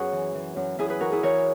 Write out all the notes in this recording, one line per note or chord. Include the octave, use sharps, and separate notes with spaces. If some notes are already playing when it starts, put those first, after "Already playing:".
Already playing: F#2 F#4 G#4 B4 C#5
E3
E3
F#2
F#2 E4 G#4
G#4 B4
E3 F#4 A#4
E4 G#4
E3 A#4 C#5